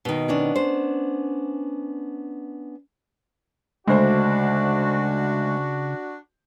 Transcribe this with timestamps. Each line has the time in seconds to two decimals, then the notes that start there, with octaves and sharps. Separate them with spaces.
0.05 B2 D#3
0.28 B3 C#4 D4
0.55 C5
3.87 D2 C#3 G#3 D4 F#4 C5